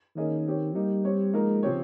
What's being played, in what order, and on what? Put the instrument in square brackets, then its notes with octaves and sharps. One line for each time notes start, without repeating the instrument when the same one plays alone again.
[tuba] D#3 [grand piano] A#3 C#4 G#4 D#5
[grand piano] C4 G4 C#5
[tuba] G3 [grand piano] A#3 D#4 G4
[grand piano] C4 G4 C#5
[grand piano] F3 A#3 D#4 A#4 [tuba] G#3
[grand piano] C#3 F3 C4 G4 C#5